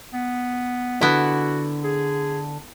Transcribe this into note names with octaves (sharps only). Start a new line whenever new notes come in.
B3
D3 B3 E4 F#4
G#4